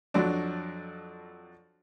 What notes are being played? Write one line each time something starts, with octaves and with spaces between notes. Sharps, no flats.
F2 F#3 D4